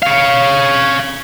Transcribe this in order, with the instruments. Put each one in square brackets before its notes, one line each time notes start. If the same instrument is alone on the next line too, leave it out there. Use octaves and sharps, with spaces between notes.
[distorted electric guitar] C#5 F5